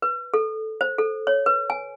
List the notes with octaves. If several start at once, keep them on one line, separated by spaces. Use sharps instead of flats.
B4
A4
C5
A4
C#5
B4
G#5